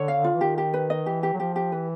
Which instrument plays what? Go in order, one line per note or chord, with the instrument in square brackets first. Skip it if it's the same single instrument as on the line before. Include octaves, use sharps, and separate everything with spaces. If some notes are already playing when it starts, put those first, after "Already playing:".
Already playing: [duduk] D3 [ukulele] C#5
[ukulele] F5
F4
[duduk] E3
[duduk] D#3 [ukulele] G4
[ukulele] G4
B4
D#5
[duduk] E3 [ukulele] G4
[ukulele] G4
[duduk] F#3
[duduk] F3 [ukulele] G4
[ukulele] G4
[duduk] E3 [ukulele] B4